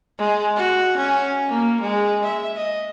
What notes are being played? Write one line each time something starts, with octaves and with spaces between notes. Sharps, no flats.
G#3
F#4
C#4
A#3
G#3
E5
D#5